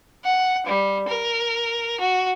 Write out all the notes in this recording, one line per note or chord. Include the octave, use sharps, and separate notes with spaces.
F#5
G3
A#4
F#4